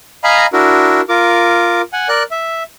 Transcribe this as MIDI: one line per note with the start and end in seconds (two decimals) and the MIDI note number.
0.24 0.46 75
0.24 0.46 77
0.24 0.46 80
0.24 0.46 82
0.24 0.46 83
0.53 1.01 62
0.53 1.01 64
0.53 1.01 66
0.53 1.01 70
1.09 1.82 65
1.09 1.82 70
1.09 1.82 86
1.93 2.08 78
1.93 2.08 80
2.09 2.23 70
2.09 2.23 74
2.09 2.23 90
2.31 2.63 76